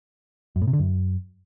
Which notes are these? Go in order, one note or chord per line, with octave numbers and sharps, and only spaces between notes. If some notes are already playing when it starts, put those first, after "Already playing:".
F#2
A2
C3
D3
F#2